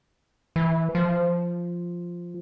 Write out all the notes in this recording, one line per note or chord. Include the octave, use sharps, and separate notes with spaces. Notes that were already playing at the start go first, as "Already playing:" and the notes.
E3
F3